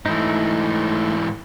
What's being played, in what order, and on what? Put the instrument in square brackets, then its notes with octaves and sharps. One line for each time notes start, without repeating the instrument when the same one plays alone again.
[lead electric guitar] G#2 E3 [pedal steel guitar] A3 D#4